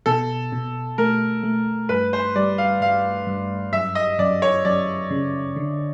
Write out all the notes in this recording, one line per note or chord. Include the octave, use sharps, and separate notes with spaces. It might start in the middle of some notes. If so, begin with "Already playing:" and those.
B2 A4
B2
A3 A#4
A3
G2 B4
C5
G3 D5
F5
G2 F5
G2
F#2 E5
D#5
F#2 D5
C#5
F#2 D5
C#3
D3